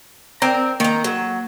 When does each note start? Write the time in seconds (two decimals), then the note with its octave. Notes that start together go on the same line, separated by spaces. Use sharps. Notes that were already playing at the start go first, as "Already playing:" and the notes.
0.42 C4 A#4 D5 A#5
0.80 D#3 A#3 A#5
1.04 F#3